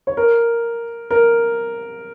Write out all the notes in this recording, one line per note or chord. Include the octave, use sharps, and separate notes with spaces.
C#5
A#4
A#4